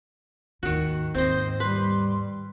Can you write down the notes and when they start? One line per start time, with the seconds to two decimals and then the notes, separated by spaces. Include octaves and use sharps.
0.63 D#2 G#2 D#3 F#4
1.15 D#2 G#2 C4 C5 D#5
1.60 G3 B4 C6